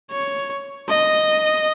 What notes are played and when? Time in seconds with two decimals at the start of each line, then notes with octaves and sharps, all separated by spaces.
0.11 C#5
0.88 D#5